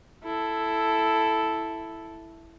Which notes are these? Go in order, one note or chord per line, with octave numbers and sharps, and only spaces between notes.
E4 A4